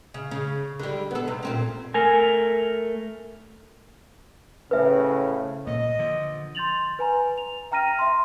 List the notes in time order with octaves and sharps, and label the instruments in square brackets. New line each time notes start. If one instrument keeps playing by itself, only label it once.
[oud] C#3
C#3
D3 G3
B3 A4
G2 C3
A#2 C4 C#4
[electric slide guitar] A3 A#4 G#5
[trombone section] A2 C#3 [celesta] B4 C5 E5
[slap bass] A#2 [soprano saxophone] D#5
[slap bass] D3 F3
[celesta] C6 G6 A6 F7 F#7
B4 G#5 A#5
F7
E5 G5 A#5 F6 A#6 D#7
E5 C6